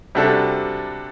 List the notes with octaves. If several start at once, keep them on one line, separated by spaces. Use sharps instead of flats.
C3 G3 D4 F#4 A4